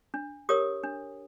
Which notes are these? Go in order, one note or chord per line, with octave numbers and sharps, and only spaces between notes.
D4
G4 A#4 C#5 D#6
D4